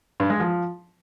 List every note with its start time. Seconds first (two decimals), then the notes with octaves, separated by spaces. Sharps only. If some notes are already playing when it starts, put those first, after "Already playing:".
0.20 G2
0.30 G#3
0.40 F3